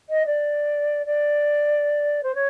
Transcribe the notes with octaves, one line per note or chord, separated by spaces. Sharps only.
D#5
D5
D5
C5
C#5